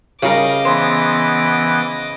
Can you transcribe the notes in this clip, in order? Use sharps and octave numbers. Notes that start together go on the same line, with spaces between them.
C#3 G3 F4 A#4 D#5 D6
E3 B3 C5 C6